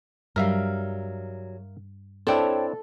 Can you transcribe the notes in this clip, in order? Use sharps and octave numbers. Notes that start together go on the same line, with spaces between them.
G2 F#3 G3 A#4 E5 F5
C4 D4 E4 A4 C5 C#5 G5